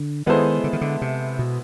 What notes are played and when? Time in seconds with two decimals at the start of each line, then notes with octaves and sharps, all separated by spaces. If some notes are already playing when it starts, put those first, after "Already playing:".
Already playing: D3
0.26 D#3 G#3 B3 E4 A4 C5
0.64 D3
0.73 D#3
0.81 D3
1.02 C3
1.39 B2